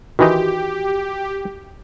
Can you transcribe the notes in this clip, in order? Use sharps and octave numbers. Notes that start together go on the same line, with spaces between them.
D#3 E3 D#4 F#4 G4